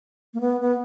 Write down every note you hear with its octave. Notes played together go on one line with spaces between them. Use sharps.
A#3
B3
B3